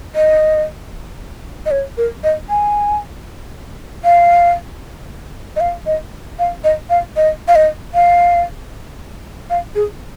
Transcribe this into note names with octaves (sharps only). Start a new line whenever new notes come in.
D#5
D#5
C#5
A#4
D#5
G#5
F5
D#5
F5
D#5
F5
D#5
F5
D#5
F5
D#5
F5
F5
G#4